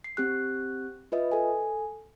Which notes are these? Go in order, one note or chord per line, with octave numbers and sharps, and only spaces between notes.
C7
C4 G4 F#6
F4 B4 D#5 E5
A4 G#5